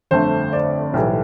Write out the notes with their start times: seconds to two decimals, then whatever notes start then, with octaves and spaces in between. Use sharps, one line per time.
0.11 G1 F2 D3 A3 C5
0.53 D5
0.93 B1 A2 E3 G3